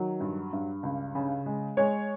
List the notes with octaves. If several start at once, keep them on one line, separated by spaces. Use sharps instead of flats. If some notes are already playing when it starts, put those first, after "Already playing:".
Already playing: D#3 F#3
G2
G2
C#2
C#3
G#3
G#3 C#5